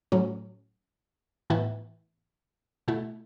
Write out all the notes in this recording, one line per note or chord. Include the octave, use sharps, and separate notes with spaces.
A2 F#3 C#4
A2 E3 B3 E4
B2 A3 E4